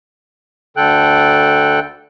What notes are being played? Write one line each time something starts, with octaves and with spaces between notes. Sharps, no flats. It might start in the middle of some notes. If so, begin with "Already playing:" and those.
D2 D3 A4 G5 F#6